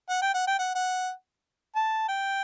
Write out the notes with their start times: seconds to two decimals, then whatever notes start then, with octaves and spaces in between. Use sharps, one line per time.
0.09 F#5
0.21 G5
0.34 F#5
0.47 G5
0.59 F#5
0.75 F#5
1.75 A5
2.08 G5